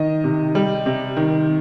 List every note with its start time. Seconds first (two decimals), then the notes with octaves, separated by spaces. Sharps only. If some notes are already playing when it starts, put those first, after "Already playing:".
Already playing: D#3 D#5
0.24 C3
0.55 G3
0.86 C3
1.17 D#3